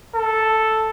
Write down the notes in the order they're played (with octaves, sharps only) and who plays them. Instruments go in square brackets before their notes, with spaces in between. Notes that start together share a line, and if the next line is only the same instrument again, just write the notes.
[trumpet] A4